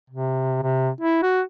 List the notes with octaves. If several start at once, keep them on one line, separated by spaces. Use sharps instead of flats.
C3
C3
E4
F#4